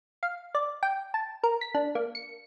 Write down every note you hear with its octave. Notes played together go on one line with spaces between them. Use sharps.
F5
D5
G5
A5
A#4
B6
D4
A#3
C#7